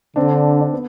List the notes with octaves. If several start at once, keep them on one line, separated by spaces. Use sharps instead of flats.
D3 C4 D4
D4
B3